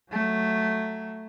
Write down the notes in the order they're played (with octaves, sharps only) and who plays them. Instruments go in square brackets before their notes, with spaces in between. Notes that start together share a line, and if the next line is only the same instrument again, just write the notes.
[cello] F#3 A3